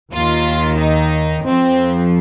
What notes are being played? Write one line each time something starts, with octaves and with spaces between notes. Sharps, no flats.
D#2 D#3 F4
D#4
F2 F3 C4